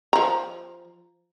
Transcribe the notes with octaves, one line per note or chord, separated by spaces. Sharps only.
F3 A#5